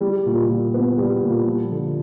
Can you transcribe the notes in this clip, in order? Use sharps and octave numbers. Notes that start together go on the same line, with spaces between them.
G3
A#2
A#2
B3
G3
A#2
F3
D3